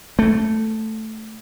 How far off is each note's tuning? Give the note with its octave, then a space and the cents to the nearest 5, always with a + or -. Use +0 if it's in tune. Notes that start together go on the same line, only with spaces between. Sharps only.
A3 +0